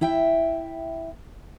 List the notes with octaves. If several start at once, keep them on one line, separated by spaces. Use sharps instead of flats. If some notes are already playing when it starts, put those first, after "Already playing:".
E4 E5 G5